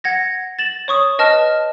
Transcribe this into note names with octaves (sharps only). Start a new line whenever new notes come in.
F#5 G#6 A#6
A6 E7 F#7
C#5 C#6 D#6
B4 D#5 A5 F6